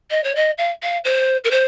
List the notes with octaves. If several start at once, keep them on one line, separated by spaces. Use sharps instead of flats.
D#5
C#5
D#5
F5
F5
C5
A#4
C5